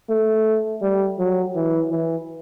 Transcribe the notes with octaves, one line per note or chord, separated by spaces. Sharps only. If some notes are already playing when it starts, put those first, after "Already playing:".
A3
G3
F#3
E3
E3